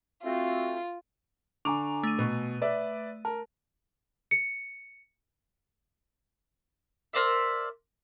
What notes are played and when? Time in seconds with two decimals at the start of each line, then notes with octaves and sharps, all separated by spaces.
0.23 A3 C4 F4 F#4
1.65 D3 G#5 A#5 C#6 D6 F7
2.03 A3 D#7
2.19 B2
2.62 B4 D5 E5
3.25 A#4 A5
4.31 C#7
7.13 A#4 C5 D5 E5